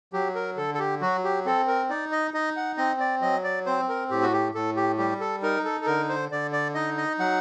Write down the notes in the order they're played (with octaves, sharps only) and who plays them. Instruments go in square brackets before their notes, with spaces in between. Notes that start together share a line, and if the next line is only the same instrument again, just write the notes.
[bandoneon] F#3 G4
A#4
D3 A4
A4
G4
F#3 F#4
G4
C4 A4
A#4
D#4 D5
D#5
D#4 D#5
F#5
C4 D#5
D5
F#3 D#5
D5
C4 C5
A#4
A2 G4
F#4
G4
A2 A4
G4
G3 G4
A4
D#4 A#4
A4
A4
D3 A#4
C5
D3 D5
D5
D#4 D#5
D#5
F#3 F#5